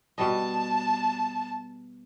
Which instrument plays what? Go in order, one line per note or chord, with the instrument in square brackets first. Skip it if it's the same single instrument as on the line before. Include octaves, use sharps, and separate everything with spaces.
[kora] B2 G3 D#5 [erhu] A5